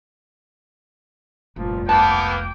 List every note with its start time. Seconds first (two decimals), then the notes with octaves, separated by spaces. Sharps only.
1.56 F1 C2 G2 A#2 F3
1.89 A#3 B3 G5 A5 D6